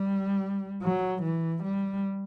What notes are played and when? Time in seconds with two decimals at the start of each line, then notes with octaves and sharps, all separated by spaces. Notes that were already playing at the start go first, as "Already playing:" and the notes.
Already playing: G3
0.83 F#3
1.23 E3
1.64 G3